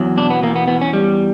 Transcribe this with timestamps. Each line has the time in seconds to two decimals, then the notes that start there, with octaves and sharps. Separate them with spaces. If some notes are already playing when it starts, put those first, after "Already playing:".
Already playing: E2 F#3
0.17 B2 D4
0.30 B3
0.43 E2 A#3
0.56 B3
0.68 E2 B3
0.81 C#4
0.93 G3